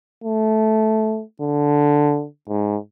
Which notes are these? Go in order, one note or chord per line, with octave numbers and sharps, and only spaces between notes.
A3
D3
G#2